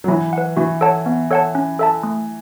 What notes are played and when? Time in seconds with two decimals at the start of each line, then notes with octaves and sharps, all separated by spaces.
0.04 F#3
0.08 E3 E4
0.33 B4 F#5
0.57 E3 F#4
0.81 A4 C#5 F#5 A5
1.06 B3
1.31 A4 C#5 F#5 A5
1.55 C#4
1.79 A4 E5 A5
2.03 A3